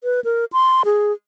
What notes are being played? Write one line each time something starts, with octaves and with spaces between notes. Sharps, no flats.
B4
A#4
C6
G#4